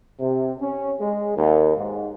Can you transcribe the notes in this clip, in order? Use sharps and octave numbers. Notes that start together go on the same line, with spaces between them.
C3
C#4
G#3
D#2
G#2